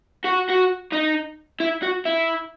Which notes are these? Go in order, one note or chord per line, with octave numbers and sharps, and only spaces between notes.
F#4
F#4
D#4
E4
F#4
E4